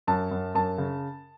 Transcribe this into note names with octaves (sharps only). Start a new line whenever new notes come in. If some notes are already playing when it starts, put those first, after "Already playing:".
F#2 A5
F#2
F#2 A5
C#3